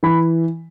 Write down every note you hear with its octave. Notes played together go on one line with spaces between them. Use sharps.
E3 B5